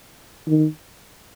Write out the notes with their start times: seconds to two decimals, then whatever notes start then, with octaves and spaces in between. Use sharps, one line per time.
0.48 D#3